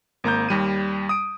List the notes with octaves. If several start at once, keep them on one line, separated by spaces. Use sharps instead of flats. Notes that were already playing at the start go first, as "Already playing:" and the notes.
G#1 A#3 A#5 G6
D#2 G3 D#7
D#6 D7